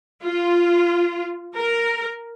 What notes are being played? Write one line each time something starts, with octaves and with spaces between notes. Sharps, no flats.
F4
A#4